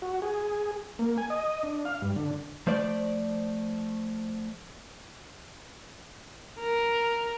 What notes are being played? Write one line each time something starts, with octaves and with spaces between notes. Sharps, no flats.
F#4
G#4
A#3
G#5
D#5
D4
F5
G2
D3
F3 A3 C5 D5
A#4